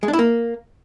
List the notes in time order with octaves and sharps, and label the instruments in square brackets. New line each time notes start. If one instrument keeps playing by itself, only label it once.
[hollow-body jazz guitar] G#3
D4
E4
A#3